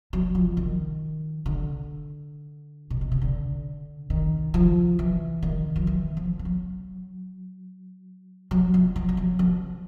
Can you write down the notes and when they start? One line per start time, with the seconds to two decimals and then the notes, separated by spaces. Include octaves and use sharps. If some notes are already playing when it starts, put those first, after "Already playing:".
0.13 F#3
0.35 F3
0.57 D#3
1.46 D3
2.90 B2
3.01 C3
3.12 C#3
3.22 D3
4.10 D#3
4.54 F3
4.99 E3
5.43 D#3
5.76 F3
5.87 E3
6.17 F3
6.39 F3
6.45 F#3
8.51 F#3
8.74 F3
8.96 F3
9.09 F3
9.17 F#3
9.39 F3